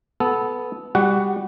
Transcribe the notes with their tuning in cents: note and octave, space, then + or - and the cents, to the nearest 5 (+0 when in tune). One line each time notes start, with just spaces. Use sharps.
B3 +0 A4 -15
G3 +20 F#4 +25 F#5 +5